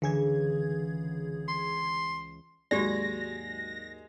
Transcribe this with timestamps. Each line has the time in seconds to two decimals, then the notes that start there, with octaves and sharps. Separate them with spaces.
0.02 C#2 D3 E3 G#3 G#4 G#6
1.49 C6
2.71 D#2 G#2 F#3 G#3 F#4 G4 D5 A#6